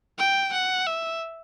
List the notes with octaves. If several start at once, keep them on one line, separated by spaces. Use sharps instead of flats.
G5
F#5
E5